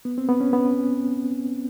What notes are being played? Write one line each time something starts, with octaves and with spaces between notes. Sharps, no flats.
B3
C4
B3
C#4
B3